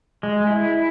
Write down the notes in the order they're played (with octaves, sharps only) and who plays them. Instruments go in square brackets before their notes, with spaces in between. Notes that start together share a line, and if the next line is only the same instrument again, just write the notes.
[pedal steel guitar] G#3
E4